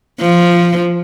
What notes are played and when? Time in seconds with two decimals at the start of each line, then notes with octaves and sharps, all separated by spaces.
0.20 F3